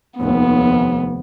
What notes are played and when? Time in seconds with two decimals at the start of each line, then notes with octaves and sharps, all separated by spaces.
0.18 F1 D#2 B3